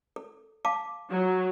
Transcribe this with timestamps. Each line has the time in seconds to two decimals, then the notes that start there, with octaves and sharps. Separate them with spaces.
0.16 A4
0.65 F5 A5 D6
1.10 F#3